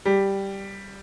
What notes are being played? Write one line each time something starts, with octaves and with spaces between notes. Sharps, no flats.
G3